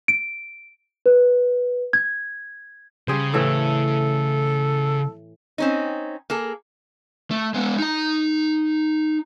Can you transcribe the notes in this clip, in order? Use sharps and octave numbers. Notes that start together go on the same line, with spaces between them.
D7
B4
G#6
C#3 G3 G#4 C5
A2 E3 A3 A4
C4 C#4 D#4
A#3 G#4 A4
A3
G#3 B3
D#4 A#5